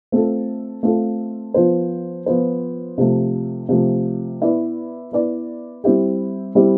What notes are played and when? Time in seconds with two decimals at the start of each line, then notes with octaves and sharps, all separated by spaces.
0.12 A3 C4 F4 A4
0.83 A3 C4 F4 A4
1.54 F3 B3 F4 C5
2.26 F3 B3 F4 C5
2.98 C3 F3 A3
3.69 C3 F3 A3
4.41 B3 E4 B4 D5
5.12 B3 E4 B4 D5
5.84 G3 C4 E4 G4
6.55 G3 C4 E4 G4